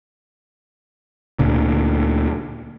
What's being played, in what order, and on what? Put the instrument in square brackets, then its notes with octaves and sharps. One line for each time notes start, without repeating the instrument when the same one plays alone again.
[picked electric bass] D2 A#2 D3